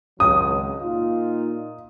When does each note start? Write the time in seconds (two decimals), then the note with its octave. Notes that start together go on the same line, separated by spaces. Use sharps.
0.20 G#1 C#2 F#3 D#6
0.81 A#2 D#4 F4